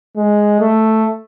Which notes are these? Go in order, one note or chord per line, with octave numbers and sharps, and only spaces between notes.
G#3
A3